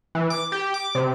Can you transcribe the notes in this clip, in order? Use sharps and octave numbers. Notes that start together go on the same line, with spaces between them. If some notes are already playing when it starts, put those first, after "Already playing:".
E3
D6
G4
D6
C3